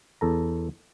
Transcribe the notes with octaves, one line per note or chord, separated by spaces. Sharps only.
E2 A4 A#5